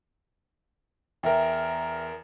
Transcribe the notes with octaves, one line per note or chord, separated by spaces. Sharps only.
E2 A#4 B4 E5 G5